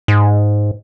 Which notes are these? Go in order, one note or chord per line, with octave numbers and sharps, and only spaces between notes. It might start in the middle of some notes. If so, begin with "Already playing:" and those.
G#2